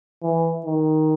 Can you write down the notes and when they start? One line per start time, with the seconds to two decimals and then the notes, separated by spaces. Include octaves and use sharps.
0.23 E3
0.66 D#3